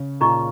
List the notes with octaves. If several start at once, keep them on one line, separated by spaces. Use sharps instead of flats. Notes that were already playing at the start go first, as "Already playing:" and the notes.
Already playing: C#3
A#2 D#4 G#4 D#5 A#5 C#6